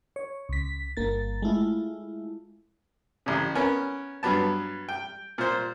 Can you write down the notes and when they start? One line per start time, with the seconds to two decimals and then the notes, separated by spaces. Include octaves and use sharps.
0.16 C#5
0.49 C#2 B6
0.97 G1 A#3 A6
1.42 G#3 A3 E4 F4
3.26 A1 C#3
3.55 B3 C#4 A#4
4.23 G2 F#3 B3 A5
4.89 G5
5.38 A#2 C5